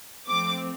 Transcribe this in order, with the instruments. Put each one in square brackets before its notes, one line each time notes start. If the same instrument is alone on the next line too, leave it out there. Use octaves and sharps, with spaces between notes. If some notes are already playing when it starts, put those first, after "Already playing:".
[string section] F3 A3 C4 D6